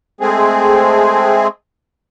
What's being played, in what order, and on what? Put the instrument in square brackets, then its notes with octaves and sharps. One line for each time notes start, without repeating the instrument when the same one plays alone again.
[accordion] G#3 A3 C4 G#4